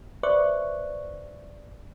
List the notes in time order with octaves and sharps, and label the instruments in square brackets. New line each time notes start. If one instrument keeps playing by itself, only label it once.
[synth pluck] B4 C5 D5 E5 C#6 F#6